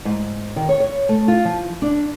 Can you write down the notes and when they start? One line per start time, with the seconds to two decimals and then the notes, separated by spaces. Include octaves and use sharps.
0.05 G#2
0.56 D#3
0.69 C#5
0.80 C#5
1.09 A3
1.28 F4
1.45 F3
1.82 D4